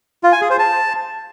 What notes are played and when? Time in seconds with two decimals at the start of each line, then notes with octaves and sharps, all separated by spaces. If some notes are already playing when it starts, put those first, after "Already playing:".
0.23 F4
0.32 G#5
0.41 G#4
0.50 C5
0.59 A5